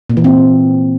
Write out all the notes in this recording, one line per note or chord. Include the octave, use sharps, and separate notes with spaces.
A#2
E3
C4